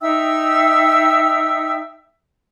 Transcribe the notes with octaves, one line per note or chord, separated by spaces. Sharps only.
D#4 E5 G5 E6